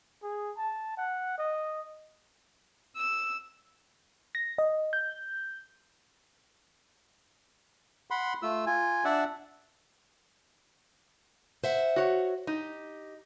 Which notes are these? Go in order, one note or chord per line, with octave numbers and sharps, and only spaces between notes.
G#4
A5
F#5
D#5
E6
A#6
D#5
G6
F#5 B5 C6
A3 F4 E6
F4 G#5
D4 D5 E5 F#5
C5 E5 F#5
F#4 C#5
D#4 G4